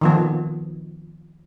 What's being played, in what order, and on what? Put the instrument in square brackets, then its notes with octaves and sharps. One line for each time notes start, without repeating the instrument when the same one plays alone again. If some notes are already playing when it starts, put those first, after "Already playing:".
[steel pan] D#3 F3 B3